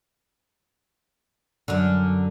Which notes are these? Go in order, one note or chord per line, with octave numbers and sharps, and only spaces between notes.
F#2 D3